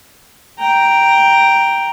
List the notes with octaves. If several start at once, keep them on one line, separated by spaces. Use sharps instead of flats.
G5 A#5